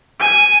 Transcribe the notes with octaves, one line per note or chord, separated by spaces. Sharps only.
G#5